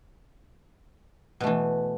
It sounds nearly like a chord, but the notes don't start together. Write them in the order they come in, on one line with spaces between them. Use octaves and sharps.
B2 A3 E3